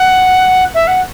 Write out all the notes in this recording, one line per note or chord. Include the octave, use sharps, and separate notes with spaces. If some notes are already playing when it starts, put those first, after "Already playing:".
Already playing: F#5
E5
F#5